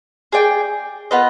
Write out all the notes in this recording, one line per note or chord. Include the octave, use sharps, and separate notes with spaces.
G#4 D5 G5
B3 F4 B4 D#5